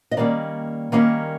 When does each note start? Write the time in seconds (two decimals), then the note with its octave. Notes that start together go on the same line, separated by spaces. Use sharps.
0.11 D#5
0.17 D#3 G3 A#3 C#4 D5
0.92 D#3 G3 A#3 C#4